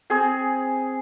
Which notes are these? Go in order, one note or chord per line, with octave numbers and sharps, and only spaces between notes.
C4 G#4